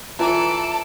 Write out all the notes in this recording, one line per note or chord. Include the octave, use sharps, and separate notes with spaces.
E3 F4 A4 D5 A5 A#5